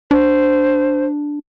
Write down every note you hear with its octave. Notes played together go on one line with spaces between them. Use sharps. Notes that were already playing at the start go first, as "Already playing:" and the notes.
D4 C5